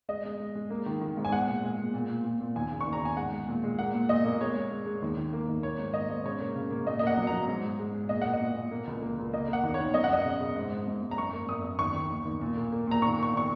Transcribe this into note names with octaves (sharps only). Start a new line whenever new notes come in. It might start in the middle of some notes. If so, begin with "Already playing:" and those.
G#3 D#5
G#3
G#3
G#3
A#3
D#3
D#3
G#2
G#5
G#3 F#5
A#2
G#3
A#2
A#2
A#2
A#2
A#2
D#2 G#5
C#3
C#6
D#2
A#5
D#2 G#5
G#3 F#5
G#3
A#2
G#3
A#3 F#5
A#2
A#2 D#5
A#3
G#3 C#5
G#3
G#3
G#3
D#2
D#3
A#3
D#2
A#3 C#5
G#2
A#3 D#5
G#2
C#3 C#5
A#3
C#3
A#3
A#2 D#5
A#3 D#5
F#5
F#3
A#5
F#3
G#2
G#3
G#3
G#3
A#2 D#5
A#3 F#5
D#5
A#2
A#2
A#3
C#2
A#3
C#2
A#3 D#5
A#3
F#5
D#2
C#5
D#3
F#2 D#5
F#5
F#2 D#5
C#3
C#3
G#2
G#2
G#2
G#2
A#5
F#2 C#6
A#3
F#2 D#6
F#2
D#2 C#6
D#3
D#2
D#2
A#2
A#3
A#3
A#2 A#5
D#3 C#6
A#3
C#6
D#3 C#6